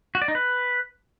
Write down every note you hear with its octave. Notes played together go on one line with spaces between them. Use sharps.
F#4
D5
D#4
B4